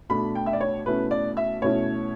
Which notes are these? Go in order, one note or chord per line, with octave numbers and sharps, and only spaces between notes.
B2 A3 D4 B5
G5
E5
D5
C#5
B2 A3 C#4 E4 B4
D5
E5
B2 A3 C#4 E4 C#5